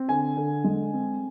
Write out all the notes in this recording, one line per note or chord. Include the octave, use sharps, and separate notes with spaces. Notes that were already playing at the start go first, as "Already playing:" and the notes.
Already playing: C4
D3 G#5
D3
G#3
C4